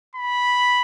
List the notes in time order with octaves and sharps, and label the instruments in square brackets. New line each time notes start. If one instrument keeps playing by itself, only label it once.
[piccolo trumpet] B5